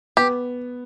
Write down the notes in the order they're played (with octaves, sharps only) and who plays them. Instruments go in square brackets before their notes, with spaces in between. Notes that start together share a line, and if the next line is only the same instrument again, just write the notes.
[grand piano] B3 [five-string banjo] G4